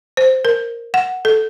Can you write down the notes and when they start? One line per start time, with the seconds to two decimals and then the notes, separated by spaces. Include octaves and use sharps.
0.17 C5
0.45 A#4
0.94 F#5
1.25 A4